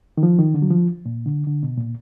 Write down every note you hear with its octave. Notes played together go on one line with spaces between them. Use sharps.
D#3
F3
D#3
D3
F#3
F3
A#2
D3
D3
B2
A#2